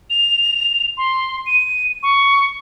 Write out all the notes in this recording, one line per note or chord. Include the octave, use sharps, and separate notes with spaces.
F7
C6
D#7
C#6